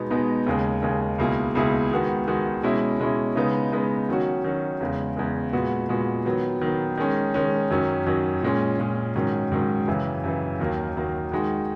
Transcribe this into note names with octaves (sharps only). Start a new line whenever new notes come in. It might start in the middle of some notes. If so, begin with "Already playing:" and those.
Already playing: B2 G#3 B3 D#4
B2 G#3 B3 D#4
D#2 C#3 G#3
D#2 C#3 G#3
C#2 B2 A#3 E4 G#4
C#2 B2 A#3 E4 G#4
D#3 G#3 B3 F#4
D#3 G#3 B3 F#4
B2 G#3 C#4 E4
B2 G#3 C#4 E4
C#3 G#3 B3 D#4
C#3 G#3 B3 D#4
D#3 F#3 C#4 F#4
D#3 F#3 C#4 F#4
E2 C#3 G#3
E2 C#3 G#3
A#2 G#3 B3 F#4
A#2 G#3 B3 F#4
D#3 F#3 B3
D#3 F#3 B3
D#3 G#3 C#4
D#3 G#3 C#4
F#2 D#3 F#3 C#4
F#2 D#3 F#3 C#4
A#2 G#3 C#4
A#2 G#3 C#4
G#2 D#3 F#3 C#4
G#2 D#3 F#3 C#4
F#2 C#3 E3
F#2 C#3 E3
D#2 D#3 F#3 A#3
D#2 D#3 F#3 A#3
D#3 G#3 D#4 F#4